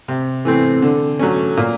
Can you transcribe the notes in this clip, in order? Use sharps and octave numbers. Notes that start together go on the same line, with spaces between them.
C3
E3 A3 C4
D3
F#3 A3 C#4
A#2